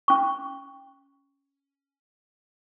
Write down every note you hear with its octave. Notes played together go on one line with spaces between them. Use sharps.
C#4 C#6